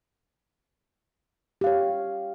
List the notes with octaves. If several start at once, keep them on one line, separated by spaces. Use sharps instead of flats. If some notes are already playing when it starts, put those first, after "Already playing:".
G4 C#5 F5